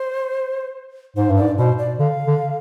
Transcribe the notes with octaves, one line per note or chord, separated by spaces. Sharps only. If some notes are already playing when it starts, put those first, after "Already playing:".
Already playing: C5
G#2 C5
G2
G#2 D5
B2 C5
D5
D3 F5
D3